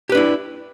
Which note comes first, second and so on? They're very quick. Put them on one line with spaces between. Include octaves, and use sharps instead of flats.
G4 B4 D4 E4